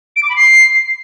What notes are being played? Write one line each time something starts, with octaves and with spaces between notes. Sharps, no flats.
D7
D6
B5
C7